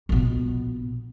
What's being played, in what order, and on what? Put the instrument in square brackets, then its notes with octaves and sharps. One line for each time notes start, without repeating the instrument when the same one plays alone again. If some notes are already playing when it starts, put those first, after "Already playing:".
[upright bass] A#1 B2